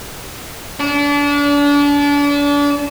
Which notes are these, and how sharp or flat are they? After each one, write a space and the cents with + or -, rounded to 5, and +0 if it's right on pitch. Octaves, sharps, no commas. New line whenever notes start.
D4 -35